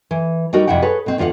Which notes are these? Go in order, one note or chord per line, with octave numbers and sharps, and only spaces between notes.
E3
G3 D#4 F#4 A#4
F2 C3 E4 F#5 G5
G#4 A4 B4 C#5
B2 C4
E2 D3 F4 D5 F#5